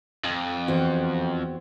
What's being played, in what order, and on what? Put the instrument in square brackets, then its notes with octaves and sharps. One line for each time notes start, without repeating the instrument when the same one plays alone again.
[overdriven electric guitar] F2
[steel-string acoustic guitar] E2 C4 F#4